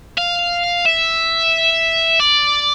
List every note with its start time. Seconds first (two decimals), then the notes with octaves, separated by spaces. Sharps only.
0.18 F5
0.86 E5
2.20 D5